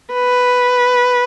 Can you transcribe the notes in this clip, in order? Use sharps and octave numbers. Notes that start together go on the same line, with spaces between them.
B4